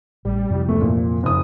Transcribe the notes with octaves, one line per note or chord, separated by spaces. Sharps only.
A1 G3
F2 C3 E3
D2 A3
C2 A#2
F#1 D#6